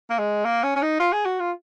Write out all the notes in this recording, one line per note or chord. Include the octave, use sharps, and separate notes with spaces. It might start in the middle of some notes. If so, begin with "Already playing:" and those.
A#3
G#3
A#3
C#4
C#4
D#4
F4
G#4
F#4
F4